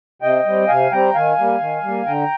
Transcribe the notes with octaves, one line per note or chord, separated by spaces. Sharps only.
C3 D#5 G5
G3 C4
C3 F5 G#5
G3 C4 G5 A#5
D#3 F5 G#5
G3 A#3
D#3
G3 A#3
D3 G5 A#5